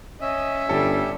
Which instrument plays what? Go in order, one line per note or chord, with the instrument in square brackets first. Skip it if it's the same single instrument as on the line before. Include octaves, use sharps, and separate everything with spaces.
[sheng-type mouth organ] C#4 E5 [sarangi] D#5
[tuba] G1 [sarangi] G3 [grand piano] A4